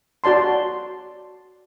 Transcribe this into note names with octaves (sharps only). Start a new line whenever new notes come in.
F#4 D5 A5 C6